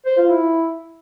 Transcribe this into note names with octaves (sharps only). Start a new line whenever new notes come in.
C5
F4
E4